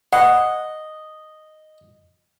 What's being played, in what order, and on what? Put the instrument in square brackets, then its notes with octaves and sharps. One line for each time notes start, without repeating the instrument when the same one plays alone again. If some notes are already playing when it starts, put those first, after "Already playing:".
[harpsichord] D#5 [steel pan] F#5